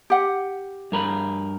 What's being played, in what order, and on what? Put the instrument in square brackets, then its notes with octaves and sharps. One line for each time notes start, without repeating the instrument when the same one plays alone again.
[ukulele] G4 F#5
[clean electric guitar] G2 A#4 B5